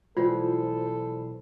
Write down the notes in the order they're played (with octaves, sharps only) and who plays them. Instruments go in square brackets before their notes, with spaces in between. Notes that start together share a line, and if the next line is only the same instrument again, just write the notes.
[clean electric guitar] B1 C5 [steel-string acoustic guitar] E3 G3 G#3 [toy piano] F4 [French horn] A4